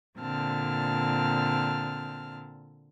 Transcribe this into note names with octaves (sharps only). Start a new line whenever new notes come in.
A#2 D3 C4 A5 F6